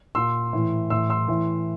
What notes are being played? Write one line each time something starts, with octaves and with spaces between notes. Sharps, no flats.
A#2 C6 E6
A2 E3
A2 E3 C6 E6
C6 E6
A2 E3